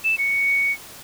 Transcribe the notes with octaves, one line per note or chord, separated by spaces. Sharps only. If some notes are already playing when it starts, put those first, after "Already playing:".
E7
C#7